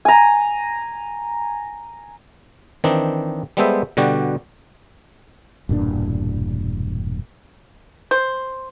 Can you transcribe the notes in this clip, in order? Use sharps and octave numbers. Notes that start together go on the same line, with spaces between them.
G#5 A#5
D#3 E3 C4 D4 D#4
G3 G#3 B3 A4 C5 E5
B2 D3 G3 F#4 G4
E1 G2 A#2 D4
C5